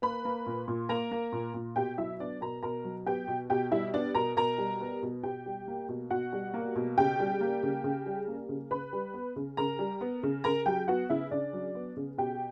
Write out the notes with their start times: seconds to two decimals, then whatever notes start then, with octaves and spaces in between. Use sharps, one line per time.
0.02 A#3 B4 B5
0.25 A#3
0.46 A#2
0.68 A#2
0.89 A#3 A#4 A#5
1.11 A#3
1.32 A#2
1.54 A#2
1.76 B2 G4 G5
1.97 F#3 E4 E5
2.20 B3 D4 D5
2.41 B2 A#4 A#5
2.63 B2 A#4 A#5
2.84 F#3
3.06 B3 G4 G5
3.28 B2
3.50 B2 G4 G5
3.71 G3 E4 E5
3.94 B3 D4 D5
4.15 B2 A#4 A#5
4.37 B2 A#4 A#5
4.58 G3
4.81 B3
5.02 B2
5.23 B2 G4 G5
5.46 G3
5.68 A#3
5.88 B2
6.11 B2 F#4 F#5
6.33 G3
6.54 A#3
6.76 B2
6.98 C#3 G4 G5
7.20 G3
7.41 A#3
7.63 C#3
7.84 C#3
8.06 G3
8.28 A#3
8.49 C#3
8.71 C#3 B4 B5
8.93 G3
9.14 B3
9.36 C#3
9.57 C#3 A#4 A#5
9.79 G3
10.01 B3
10.23 C#3
10.44 C#3 A#4 A#5
10.66 F#3 G4 G5
10.88 B3 F#4 F#5
11.10 C#3 E4 E5
11.31 C#3 D4 D5
11.53 F#3
11.75 B3
11.97 C#3
12.18 B2 G4 G5